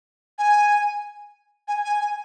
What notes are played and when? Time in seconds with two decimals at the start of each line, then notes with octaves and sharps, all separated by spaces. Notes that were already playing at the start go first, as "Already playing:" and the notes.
0.38 G#5
1.68 G#5
1.85 G#5
2.00 G#5